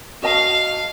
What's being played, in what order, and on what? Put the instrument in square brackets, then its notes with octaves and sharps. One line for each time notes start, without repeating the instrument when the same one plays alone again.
[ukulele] F#4 D#5 A5 [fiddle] F5